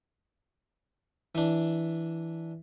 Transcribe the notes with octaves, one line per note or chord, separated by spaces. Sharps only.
E3 D4